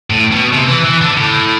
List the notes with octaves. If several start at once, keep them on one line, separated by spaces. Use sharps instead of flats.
A2
B2
C3
E3
E3
D3
A2